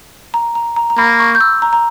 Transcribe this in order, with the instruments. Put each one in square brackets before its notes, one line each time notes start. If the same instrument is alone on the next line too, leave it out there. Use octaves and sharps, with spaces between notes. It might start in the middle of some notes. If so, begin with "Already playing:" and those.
[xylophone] A#5
A#5
A#5
A#5
[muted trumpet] A#3 [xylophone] B5
[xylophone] C#6
G6
E6
A#5
A#5